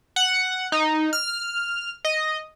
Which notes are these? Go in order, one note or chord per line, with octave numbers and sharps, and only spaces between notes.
F#5
D#4
F6
D#5